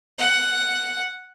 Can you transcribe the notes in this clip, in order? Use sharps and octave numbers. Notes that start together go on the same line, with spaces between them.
F#5